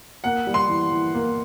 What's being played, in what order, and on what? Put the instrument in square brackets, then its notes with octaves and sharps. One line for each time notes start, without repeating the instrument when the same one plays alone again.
[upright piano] A#3 [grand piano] F#5
[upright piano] G3
[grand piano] C6
[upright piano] E3
E3
A#3